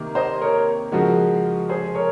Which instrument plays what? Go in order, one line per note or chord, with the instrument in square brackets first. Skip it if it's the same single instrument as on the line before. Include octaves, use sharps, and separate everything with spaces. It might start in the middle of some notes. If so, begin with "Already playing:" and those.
Already playing: [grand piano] C3 D#3 A#3
[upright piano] C5 D#5
A#4 C#5
[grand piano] C#3 F3 G#3 [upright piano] F#4 A#4
[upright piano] G#4 C5
A#4 C#5